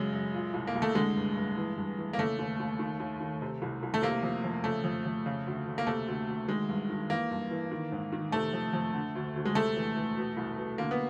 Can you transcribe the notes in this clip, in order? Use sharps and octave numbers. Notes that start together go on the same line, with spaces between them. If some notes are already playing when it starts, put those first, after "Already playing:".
Already playing: F#2 C#3 G#3
F#2
A#2
C2
A#3
C2
A3
D3 G#3
G2
G2
E3
G2
E3
A#3
C#3 A3
D#2
D#2
D#3
D#2
D#3
C3
C2
C2
A3
C3 A#3
F2
F2
C#3 A3
F2
F2
C#3
D2
D2
A#3
C3 A3
D2
D2
D#3 G#3
G2
D#3
E3 A#3
G2
E3
D#3
G#2
D#3
C3 A3
F2
F2
D3
D2
D2
G#3
C3 A3
E2
E2
B2
C2
B2
D3 A#3
B3